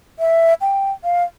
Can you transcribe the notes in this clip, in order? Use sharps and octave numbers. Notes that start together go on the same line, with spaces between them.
E5
G5
F5